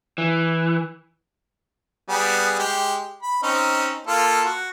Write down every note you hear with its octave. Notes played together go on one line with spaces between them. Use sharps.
E3
G3 B3 G#4
G#3 G4
B5
C4 C#4 D#4
A#3 F4 A4
F#4